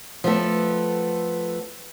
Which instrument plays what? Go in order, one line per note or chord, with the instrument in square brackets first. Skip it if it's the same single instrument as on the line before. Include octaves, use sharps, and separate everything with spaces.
[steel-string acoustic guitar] F3 A3 B3 A4